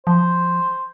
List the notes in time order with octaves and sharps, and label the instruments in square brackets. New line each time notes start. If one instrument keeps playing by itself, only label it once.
[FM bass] F3 [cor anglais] C5